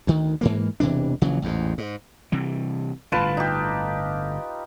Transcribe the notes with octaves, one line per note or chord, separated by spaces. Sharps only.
D2 D#3
G#2 E3 A#3
E1 C3 E3 D4
A#1 C#3 E3 F#3
A1 E2 G#2
G#2
C3 E3 G3
G1 A2 D3 F4 B4 A5
D#4 G4